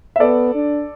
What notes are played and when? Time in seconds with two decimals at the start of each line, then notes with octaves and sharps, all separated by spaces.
0.16 E5
0.20 B3 A4 D5
0.55 D4